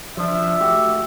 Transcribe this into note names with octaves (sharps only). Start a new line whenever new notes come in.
F3 D4 E5
A3 F#4 G4